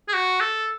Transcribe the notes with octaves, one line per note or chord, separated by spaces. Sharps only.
G#4
F#4
A4